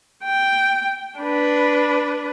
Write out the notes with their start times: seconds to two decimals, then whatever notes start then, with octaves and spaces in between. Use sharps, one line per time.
0.24 G5
1.19 D4 B4